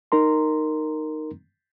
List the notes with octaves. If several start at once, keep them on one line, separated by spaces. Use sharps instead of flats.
D#4 A#4 A#5 C6